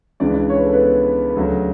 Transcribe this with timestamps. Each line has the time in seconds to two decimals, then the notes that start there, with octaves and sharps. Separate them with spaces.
0.20 C#2 C#3 E3 D4 D5
0.34 D4 D5
0.49 C#5
0.57 B4
0.65 A4
0.72 B3 B4
1.30 B4
1.36 D2 C#3 F#3 A4